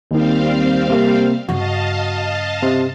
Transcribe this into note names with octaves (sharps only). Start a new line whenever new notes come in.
D#2 D#3 G3 C4 F5
C3 A#3
G2 C#3 F#4 D#5 F5 A5
C3